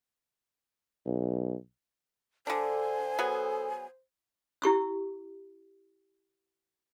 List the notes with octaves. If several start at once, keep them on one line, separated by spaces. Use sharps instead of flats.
B1
D3 D4 A4 C5 G#5
F#3 B3 G#4
E4 G4 C#6 E6